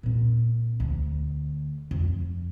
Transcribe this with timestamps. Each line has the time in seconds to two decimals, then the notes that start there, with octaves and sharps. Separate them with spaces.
0.03 A#2 C4
0.80 D2
1.91 F2